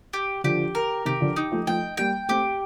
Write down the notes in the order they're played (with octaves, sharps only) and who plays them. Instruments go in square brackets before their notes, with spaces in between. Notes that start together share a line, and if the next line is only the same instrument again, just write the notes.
[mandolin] G4
[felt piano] D3 F3 [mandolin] G4
[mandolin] A#4
[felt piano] C3 D#3 [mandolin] G4
[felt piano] D3 F3
[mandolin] D#4
[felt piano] F3 A3
[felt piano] F3 A3 [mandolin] G5
[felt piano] G3 A#3 [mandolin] G5
[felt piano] A3 C4 [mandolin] G4